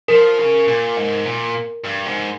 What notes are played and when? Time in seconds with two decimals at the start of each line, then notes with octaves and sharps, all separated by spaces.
0.08 F3 A#4
0.38 C#3
0.68 A#2
0.97 G#2
1.25 A#2
1.84 G2
2.05 G#2